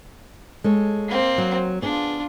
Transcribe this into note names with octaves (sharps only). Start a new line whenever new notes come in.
G#3 A4 C#5
A#3 C4
F#3
B3 D4 F4 G#4